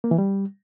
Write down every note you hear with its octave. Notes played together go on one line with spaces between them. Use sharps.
A#3
E3
G3